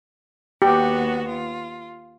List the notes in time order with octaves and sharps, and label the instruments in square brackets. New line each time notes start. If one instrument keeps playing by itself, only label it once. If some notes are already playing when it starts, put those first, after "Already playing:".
[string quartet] D#2 B3 F#4 [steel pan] G4
[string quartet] F4